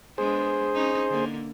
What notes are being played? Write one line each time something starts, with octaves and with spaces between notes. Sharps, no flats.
G#3 B3 D4 G#4 C5
C#4 D#4
D3 A#3